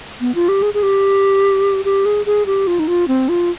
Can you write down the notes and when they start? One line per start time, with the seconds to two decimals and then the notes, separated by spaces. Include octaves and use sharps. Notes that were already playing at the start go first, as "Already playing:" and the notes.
0.21 B3
0.35 F4
0.49 G4
0.62 G#4
0.74 G#4
0.83 G4
1.85 G4
2.05 G#4
2.26 G#4
2.46 G4
2.67 F4
2.79 D#4
2.88 F4
3.08 C4
3.29 F4